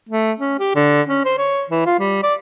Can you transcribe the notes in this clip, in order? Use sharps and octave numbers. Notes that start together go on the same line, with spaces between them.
A3
C#4
G4
D3
C#4
C5
C#5
E3
F4
G3
D5